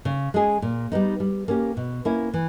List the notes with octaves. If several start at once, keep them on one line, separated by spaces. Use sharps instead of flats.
C#3
G#3 C#4 G#4
A#2
G3 B3 D#4
G3
A#3 C#4 G4
B2
A#3 C#4 E4
E3